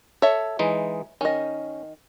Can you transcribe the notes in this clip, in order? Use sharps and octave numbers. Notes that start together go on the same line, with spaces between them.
A4 C#5 E5
E3 G#3 D#4
D#3 C#4 D#5